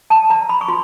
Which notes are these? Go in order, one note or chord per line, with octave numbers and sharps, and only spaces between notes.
A5
A#5
B5
C#6
F4 C6